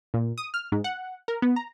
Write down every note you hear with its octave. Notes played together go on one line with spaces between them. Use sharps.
A#2
D#6
F6
G#2
F#5
A#4
B3
A#5